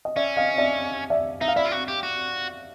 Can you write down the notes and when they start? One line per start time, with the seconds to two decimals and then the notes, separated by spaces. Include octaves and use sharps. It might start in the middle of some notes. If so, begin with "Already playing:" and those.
0.05 D#5
0.16 C#4 D5 E5
0.37 D#5 F5
0.58 D5 E5
1.10 D5 E5
1.41 D#4 E5
1.48 F5
1.56 E4 D5 E5
1.65 F4
1.72 F#4
1.88 G4
2.03 F#4